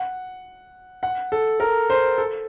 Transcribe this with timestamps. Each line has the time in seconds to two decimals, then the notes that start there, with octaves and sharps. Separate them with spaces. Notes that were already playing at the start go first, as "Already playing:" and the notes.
Already playing: F#5
1.03 F#5
1.32 A4
1.60 A#4
1.90 C5
2.18 A4